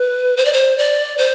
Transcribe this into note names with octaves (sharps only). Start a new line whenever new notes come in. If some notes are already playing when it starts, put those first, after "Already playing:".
Already playing: B4
C5
D5
C5
D5
C5